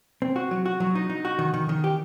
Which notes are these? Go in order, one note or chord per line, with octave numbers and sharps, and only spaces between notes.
C4
F#4
F#3
F#4
F#3
D#4
D#4
F#4
D#3
D#3
D#3
G4